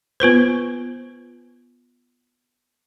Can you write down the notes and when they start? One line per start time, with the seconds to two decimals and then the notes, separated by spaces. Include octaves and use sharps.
0.20 B3 F4 B4 C5